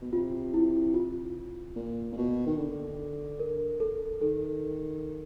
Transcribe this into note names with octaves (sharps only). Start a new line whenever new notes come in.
B2
C3 F4
E4
F4
A#2
A#2
B2
D#3
D3
A#4
A4
D#3 A4